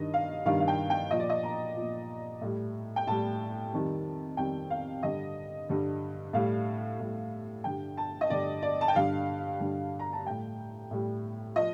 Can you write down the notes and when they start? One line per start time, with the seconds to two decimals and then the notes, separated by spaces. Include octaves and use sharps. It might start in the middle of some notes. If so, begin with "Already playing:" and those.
Already playing: G2 D#3 G3 D#5
0.14 F5
0.45 G2 D#3 G3 F5
0.60 F5
0.68 G5
0.90 G5
1.11 A#2 F3 D#5
1.20 D5
1.30 D#5
1.43 A#5
1.77 A#2 F3
2.41 A2 G3
2.96 G5
3.07 A2 G3 A5
3.73 F2 D#3 G3
4.37 F2 D#3 G3 G5
4.70 F5
5.03 G2 D3 G3 D#5
5.69 G2 D3 G3
6.33 A2 G3 F5
6.99 A2 G3
7.64 G2 D3 G3 G5
7.97 A5
8.21 D#5
8.30 G2 D3 G3 D5
8.62 D5
8.81 A5
8.88 G5
8.96 G2 D3 G3 F5
9.60 G2 D3 G3
9.99 A#5
10.13 A5
10.25 A2 G3 G5
10.91 A2 G3
11.56 F3 D#5